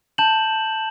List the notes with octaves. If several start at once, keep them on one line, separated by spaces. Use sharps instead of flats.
A5 G6 E7 F#7